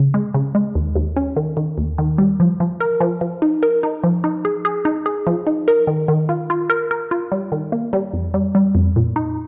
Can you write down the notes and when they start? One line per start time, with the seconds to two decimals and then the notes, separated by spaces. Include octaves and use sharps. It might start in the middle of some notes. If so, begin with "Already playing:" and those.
Already playing: C#3
0.14 G#3
0.34 C#3
0.55 G#3
0.75 D#2
0.96 D#2
1.16 C#4
1.36 D#3
1.57 D#3
1.78 D#2
1.98 D#3
2.18 G3
2.40 F3
2.60 F3
2.80 A#4
3.00 F3
3.21 F3
3.42 D#4
3.63 A#4
3.83 D#4
4.04 F3
4.24 D#4
4.45 G#4
4.65 G#4
4.85 D#4
5.06 G#4
5.27 F3
5.47 D#4
5.68 A#4
5.87 D#3
6.08 D#3
6.29 F4
6.50 F4
6.70 A#4
6.91 A#4
7.11 F4
7.32 G3
7.52 D#3
7.72 A#3
7.93 G3
8.13 F2
8.34 G3
8.55 G3
8.75 F2
8.96 A#2
9.16 D#4